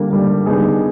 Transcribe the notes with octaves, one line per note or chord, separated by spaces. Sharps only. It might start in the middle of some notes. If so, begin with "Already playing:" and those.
Already playing: D3 G3 A#3
D3 G3 A#3
D3 G3 B3 D#4 G#4